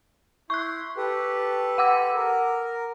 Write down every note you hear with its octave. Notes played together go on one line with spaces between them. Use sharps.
E4 C6 C#6 F#6
G4 A4 B4
F#5 D6 E6
A#4